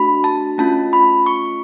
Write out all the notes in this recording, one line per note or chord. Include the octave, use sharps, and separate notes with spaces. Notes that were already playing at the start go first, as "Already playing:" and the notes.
Already playing: A3 D4 F#4 B5
A5
A3 C#4 F4 A5
B5
C#6